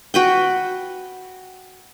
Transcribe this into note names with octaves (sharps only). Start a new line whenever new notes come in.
F#4 B4 G5